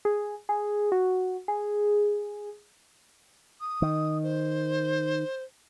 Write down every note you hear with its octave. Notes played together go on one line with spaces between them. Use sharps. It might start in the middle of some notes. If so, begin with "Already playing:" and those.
G#4
G#4
F#4
G#4
D#6
D#3
C5